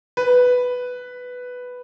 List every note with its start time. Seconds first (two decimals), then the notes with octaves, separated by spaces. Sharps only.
0.17 B4